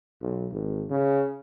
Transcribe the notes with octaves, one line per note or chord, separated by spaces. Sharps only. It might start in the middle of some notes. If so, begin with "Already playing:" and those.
B1
G#1
C#3